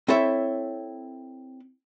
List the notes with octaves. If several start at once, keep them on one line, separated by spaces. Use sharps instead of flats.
C4 E4 A4 C#5 E5